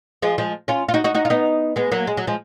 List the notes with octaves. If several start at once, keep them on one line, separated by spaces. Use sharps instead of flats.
F3 G#3
F3 G#3
C#4 F4
F4
D#4 F#4
D#4 F#4
D#4 F#4
F4
B3 D#4
G#3 B3
F#3 A#3
G#3
F#3
F3 G#3